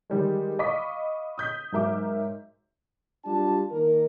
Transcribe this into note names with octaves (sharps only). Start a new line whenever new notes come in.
D#3 G3 G#3
D#5 F5 B5 C#6 D6 B6
D#6 G6 B6
G#2 F#3 A#4 E5 D6
G3 D4 F4 A5
D#3 A#3 A#4